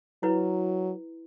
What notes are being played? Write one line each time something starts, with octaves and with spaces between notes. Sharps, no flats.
F#3 E4 B4